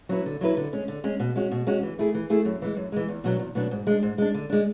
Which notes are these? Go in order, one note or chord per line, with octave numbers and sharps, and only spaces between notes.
F#3 C#4 E4 B4
D3
F#3 C#4 E4 B4
D3
G#3 C#4
D3
G#3 C#4
B2
G#3 C#4 F#4
B2
G#3 C#4 F#4
E3
A3 E4 G#4
E3
A3 E4 G#4
F#2
E3 G#3
F#2
E3 G#3
E2
B2 F#3 B3 D4
E2
B2 F#3 B3 D4
G#2
G#3 D4
G#2
G#3 D4
D3
G#3 D4